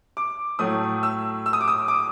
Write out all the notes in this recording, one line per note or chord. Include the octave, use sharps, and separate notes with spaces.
D6
A2 F#3 A3 D#6
E6
E6
D#6
D6
D#6
D6